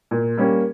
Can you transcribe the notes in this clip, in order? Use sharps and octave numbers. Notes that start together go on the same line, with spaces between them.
A#2
G3 A#3 C#4